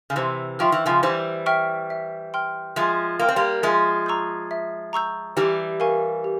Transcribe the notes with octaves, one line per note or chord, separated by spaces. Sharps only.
C#3
C3 E3 C5
F3 E5 G5 C#6 F6
E3
C#3 F3
E3 G3 C5
E5 G5 C#6 F6
E5
G5 C6 F6
F3 G#3 E5
A#3 G5 C6 F6
C4
G3 A#3
F3 G#3 E5
A#5 C#6 E6 G6
E5
A#5 C#6 E6 G6
E3 G3 G4
A#4 F5 G#5 C#6
G4